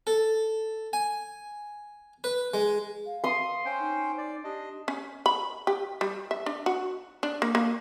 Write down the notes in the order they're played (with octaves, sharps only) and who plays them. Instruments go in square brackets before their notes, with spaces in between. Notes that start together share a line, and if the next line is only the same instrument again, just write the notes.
[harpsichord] A4
G#5
B4
G#3
[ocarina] F5
[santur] C6 D#6
[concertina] C#4 C5 G5
[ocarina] D#4
[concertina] D5
[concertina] D4 D#5 [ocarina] G4
[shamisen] C#4
B5
G4
G3
E5
D4
F#4
D4
A#3
A#3